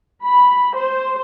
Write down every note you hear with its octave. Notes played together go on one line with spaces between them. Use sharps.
B5
C5